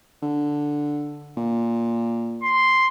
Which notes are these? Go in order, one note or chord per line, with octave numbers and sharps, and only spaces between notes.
D3
A#2
C6